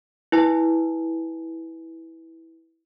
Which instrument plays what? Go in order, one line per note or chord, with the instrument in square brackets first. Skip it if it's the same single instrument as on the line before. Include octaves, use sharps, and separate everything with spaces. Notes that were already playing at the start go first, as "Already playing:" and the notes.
[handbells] E4 B4 G#5